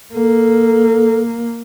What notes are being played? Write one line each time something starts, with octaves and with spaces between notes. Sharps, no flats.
A#3 A4